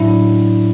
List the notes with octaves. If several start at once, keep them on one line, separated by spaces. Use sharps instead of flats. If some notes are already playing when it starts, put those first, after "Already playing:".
Already playing: A2 F#3 D4 E4